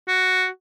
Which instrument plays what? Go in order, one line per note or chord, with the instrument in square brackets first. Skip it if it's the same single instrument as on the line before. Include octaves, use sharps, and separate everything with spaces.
[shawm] F#4